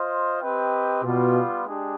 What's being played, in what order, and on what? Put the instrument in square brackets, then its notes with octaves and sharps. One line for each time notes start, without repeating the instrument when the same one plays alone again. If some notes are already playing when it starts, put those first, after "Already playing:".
Already playing: [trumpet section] F4 C5 D#5
C4 G4 B4 D#5 G5
[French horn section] B2 [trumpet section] G3 B3 F4
[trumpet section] G#3 D4 G4